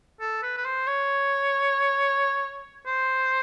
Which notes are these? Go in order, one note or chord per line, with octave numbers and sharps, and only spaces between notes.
A4
B4
B4
C5
C#5
C5